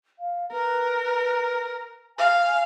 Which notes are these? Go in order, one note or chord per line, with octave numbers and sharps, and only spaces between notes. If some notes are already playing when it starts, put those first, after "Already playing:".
F5
A#4 B4
F5 G#5